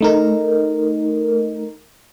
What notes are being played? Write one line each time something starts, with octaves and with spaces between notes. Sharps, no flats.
A3 D#4 A#4